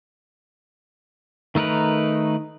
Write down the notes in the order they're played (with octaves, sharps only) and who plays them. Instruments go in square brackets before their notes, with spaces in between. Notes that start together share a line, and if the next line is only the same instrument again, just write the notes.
[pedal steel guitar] D#3 A3 D#4 A#4 B4